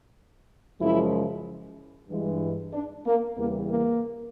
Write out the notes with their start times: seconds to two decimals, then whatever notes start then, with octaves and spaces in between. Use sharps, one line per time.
0.80 F#2 C#3 F3 G#3 E4
2.09 G2 E3 G#3
2.73 D4
3.06 A#3
3.37 E2 C#3 E3 G3 A#3
3.70 A#3